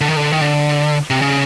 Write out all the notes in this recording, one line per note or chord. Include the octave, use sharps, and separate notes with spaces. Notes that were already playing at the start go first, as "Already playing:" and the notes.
D3
D#3
D3
D#3
D3
C3
C#3